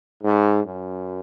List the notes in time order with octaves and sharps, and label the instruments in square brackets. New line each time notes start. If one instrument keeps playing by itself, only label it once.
[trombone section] G#2
F#2